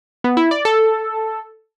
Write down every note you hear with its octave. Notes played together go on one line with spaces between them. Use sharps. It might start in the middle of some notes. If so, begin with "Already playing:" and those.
B3
E4
D5
A4